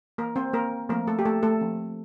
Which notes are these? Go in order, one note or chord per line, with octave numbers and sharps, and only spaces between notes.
E3 A#3 A#4
C4 C5
A#3 A#4
F3 A3 A#3 C4 A#4
A3 A4
G4
A3 A4
A3 A4
F3 C4